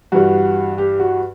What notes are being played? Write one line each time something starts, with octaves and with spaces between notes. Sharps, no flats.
G2 E3 G3 F#4
G4
F#4